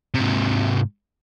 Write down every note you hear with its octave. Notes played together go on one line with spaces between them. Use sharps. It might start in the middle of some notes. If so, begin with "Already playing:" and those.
G#2 C3